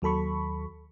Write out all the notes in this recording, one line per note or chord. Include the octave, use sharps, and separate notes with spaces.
D#2 F#3 A4 B5 C#6